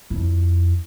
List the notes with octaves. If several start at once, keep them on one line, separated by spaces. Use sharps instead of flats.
F2 E4